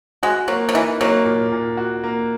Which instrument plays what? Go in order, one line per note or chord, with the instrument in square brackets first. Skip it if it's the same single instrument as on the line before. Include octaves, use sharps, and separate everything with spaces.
[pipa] G#3 [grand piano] F#4
[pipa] F#3 [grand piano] A#3
[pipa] F#3
[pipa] E3 [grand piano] D#4
[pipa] F#3 [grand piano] A#3
[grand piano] A#2
A#2
F#4
A#3